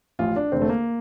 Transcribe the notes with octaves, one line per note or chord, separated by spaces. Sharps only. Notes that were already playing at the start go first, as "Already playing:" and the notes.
A1 A2 F3 F4
D4
F1 E2 D3 C4
A3
A#3